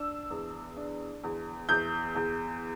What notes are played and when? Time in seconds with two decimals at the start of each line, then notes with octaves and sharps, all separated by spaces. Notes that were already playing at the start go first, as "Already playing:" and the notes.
Already playing: D4 E6
0.30 E2
0.76 D4
1.24 E2
1.69 E2 G6
2.15 E2